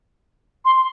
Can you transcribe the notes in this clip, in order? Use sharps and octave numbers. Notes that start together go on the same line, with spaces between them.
C6